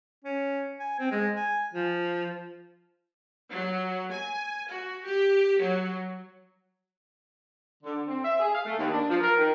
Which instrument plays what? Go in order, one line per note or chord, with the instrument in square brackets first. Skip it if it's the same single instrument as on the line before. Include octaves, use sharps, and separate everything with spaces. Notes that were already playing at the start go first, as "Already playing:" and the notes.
[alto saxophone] C#4
G#5
C4
G#3
G#5
F3
[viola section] F#3
G#5
F#4
G4
F#3
[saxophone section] D3
C4
E5
G#4
F5
A3
D#2
D4
F3
A#4
D#3